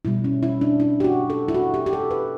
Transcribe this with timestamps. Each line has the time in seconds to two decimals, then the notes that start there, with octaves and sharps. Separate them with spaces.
0.05 B2 G3 E4
0.24 C#4
0.43 E4
0.61 D4
0.80 E4
1.00 G4
1.04 F#4
1.30 A4
1.48 E4
1.54 F#4
1.74 G4
1.86 G4
1.93 A4
2.11 B4